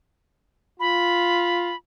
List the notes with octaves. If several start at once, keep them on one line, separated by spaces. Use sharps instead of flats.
F4 B5